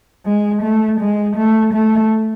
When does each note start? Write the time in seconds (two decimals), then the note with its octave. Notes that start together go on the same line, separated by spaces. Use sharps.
0.26 G#3
0.63 A3
1.00 G#3
1.37 A3
1.74 A3